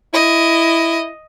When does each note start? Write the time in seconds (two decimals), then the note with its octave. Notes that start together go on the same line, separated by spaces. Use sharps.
0.14 E4 D#5